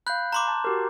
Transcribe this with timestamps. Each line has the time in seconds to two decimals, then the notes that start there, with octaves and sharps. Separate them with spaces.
0.07 F5 B5 F#6 G6
0.32 A#5 C6 D6
0.48 A5
0.64 F#4 G4 A#4